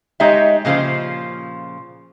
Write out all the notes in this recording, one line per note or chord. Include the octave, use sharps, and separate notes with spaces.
G#3 D#4 G4 C#5 D#5 E5
A#2 C#3 F3 F4 C5